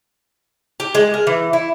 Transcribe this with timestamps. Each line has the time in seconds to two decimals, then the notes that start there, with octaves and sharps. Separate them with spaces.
0.80 G4
0.95 G#3
1.14 A#4
1.27 E3
1.53 E4